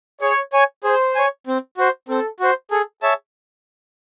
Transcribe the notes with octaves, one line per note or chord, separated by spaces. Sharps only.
G#4 C#5
C#5 G#5
G#4 C5
C#5 G#5
C4
F#4 C5
C4 A4
F#4 C5
G#4 A4
G#4 C#5 E5 A5